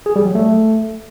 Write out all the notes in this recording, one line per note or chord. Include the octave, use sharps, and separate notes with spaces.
G#4
G3
F#3
A3